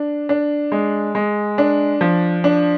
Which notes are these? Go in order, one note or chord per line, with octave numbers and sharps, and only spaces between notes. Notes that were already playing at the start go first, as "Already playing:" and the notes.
Already playing: D4
D4
G#3
G#3
D4
F3
D4